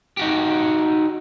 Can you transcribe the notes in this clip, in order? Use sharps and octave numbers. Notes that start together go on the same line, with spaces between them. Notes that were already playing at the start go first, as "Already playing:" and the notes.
D#4 F#4 G4